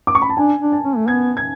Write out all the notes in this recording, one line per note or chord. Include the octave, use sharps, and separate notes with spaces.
D6
C#6
B5
A5
D4 G#5
D4
A5
C#4
A3
B3 G#6
G#6